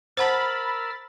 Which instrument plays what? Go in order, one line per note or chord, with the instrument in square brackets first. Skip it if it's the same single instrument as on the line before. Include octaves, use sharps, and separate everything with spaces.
[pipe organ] A#4 E6 F6 [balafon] C5 F#5 A5 [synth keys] B5 A6